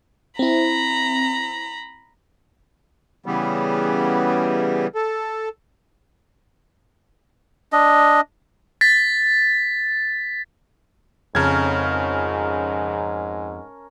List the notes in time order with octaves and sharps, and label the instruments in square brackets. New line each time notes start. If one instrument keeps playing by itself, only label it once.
[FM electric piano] C4 E4 [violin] A#5 B5
[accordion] C#3 E3 G3 B3
A4
[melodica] D4 D#5
[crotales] A6 B6
[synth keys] F2 [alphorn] G#2 [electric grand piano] C#3 G#6 [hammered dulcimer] C#4 A#4 A5